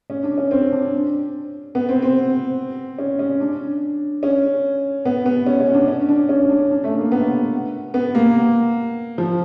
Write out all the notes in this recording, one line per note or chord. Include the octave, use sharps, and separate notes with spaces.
C#4
D4
C#4
C4
D4
B3
C4
C4
C#4
C#4
D4
C#4
B3
B3
C#4
C#4
D4
C#4
D4
C#4
D4
D4
A3
A#3
B3
B3
A#3
F3